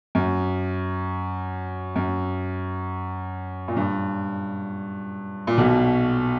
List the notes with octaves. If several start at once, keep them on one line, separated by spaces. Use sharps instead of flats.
F#2
F#2
A#2
G2
A#2
B1 B2